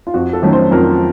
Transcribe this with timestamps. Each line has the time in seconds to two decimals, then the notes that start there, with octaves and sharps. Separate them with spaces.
0.07 F4
0.14 F2 F#4
0.33 A4
0.43 D#3 F#3 A3 C#4
0.53 C5
0.71 F2 A#4